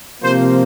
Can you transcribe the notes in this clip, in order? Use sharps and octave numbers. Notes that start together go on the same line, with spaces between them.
C3 F3 A#3 C5